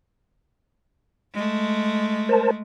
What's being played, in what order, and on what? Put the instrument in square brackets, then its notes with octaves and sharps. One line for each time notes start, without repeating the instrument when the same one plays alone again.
[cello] G#3 A3
[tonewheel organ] A#4 C5 A5